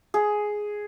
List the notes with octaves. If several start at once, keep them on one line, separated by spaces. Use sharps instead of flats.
G#4